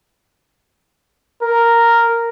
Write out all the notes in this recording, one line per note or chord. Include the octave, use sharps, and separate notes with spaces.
A#4